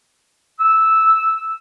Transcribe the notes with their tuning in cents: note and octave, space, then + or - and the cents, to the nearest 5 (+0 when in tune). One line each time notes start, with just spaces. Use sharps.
E6 -5